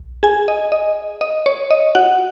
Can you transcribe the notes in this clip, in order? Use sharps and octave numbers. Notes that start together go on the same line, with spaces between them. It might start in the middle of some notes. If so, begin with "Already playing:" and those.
Already playing: B1
G#4 G#5
D#5
D#5
D#5
C#5
D#5
F#4 F#5